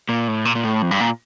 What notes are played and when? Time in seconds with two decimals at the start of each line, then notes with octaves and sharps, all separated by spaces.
0.09 A#2
0.28 A2
0.45 A#2
0.55 A#2
0.64 A2
0.82 F2
0.91 G2
1.00 A#2